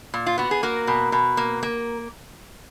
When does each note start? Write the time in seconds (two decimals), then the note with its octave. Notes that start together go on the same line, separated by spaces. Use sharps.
0.14 A#2
0.26 F4
0.38 B3 F#4
0.51 G#4
0.63 A#3 F#4 A#4
0.87 B2
1.12 B2
1.37 A#3
1.63 A#3